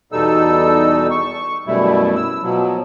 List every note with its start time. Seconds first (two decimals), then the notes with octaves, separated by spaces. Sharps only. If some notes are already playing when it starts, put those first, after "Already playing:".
0.12 E2 B2 G3 D#4 A4 E6
1.10 C#6
1.67 F#2 B2 G3 A3 E4
2.16 E6
2.42 B2 F3 F#3